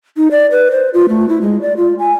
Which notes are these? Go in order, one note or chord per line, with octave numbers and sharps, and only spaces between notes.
D#4
D5
B4
C5
F4
A3
E4
G#3
D5
F4
G#5